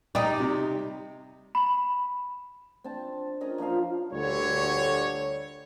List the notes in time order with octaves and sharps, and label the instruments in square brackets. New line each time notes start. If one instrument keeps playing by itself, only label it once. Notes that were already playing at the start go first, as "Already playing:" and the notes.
[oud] G3 D#4 [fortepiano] D5
[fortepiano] C3
[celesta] B5
[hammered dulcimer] C4 D4 A5
C#4 D#4 A#4 D#5
F3 D4 C5 F5
[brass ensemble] D2 A#2 D3 G3 C#5